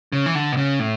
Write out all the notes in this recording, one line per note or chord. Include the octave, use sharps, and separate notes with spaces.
C#3
E3
D3
B2
C#3
A2